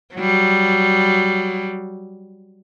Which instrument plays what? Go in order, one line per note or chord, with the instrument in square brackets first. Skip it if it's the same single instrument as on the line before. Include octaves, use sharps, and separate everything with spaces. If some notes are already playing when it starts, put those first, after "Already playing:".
[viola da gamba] F#3 G3